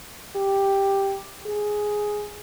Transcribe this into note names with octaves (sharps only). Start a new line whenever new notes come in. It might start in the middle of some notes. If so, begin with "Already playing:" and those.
G4
G#4